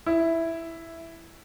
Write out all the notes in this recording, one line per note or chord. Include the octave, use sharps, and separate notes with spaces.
E4